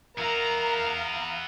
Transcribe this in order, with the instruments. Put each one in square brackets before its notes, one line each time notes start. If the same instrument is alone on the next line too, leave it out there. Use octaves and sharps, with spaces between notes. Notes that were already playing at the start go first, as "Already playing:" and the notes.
[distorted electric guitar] B3 E4 [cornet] A#4 [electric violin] F5 [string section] A#5